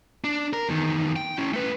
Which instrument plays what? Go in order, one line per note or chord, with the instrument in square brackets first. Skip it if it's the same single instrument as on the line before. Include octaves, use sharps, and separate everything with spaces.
[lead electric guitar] D4
A#4
E2 D#3
G5
C#4 E4
A3 B4